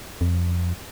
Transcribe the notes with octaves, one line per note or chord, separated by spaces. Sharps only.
F2